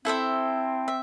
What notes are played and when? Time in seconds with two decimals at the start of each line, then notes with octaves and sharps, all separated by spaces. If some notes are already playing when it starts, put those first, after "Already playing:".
0.05 C4 E4 A4 C5 E5
0.88 E5